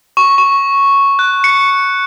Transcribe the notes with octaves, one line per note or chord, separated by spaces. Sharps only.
C#6
C#6
F#6
C#7